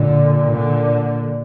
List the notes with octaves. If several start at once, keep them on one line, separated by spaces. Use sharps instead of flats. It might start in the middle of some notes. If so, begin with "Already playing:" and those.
Already playing: A#2 D3
D3